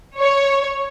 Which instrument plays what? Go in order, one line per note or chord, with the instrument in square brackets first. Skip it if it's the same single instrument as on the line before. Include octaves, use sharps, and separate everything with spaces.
[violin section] C#5